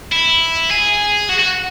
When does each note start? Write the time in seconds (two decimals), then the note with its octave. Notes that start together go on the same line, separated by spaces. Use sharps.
0.12 E4
0.71 G#4
1.29 F#4
1.39 F#4